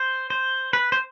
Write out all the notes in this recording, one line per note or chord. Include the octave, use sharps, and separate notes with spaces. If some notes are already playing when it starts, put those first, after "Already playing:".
Already playing: C5
C5
B4
C5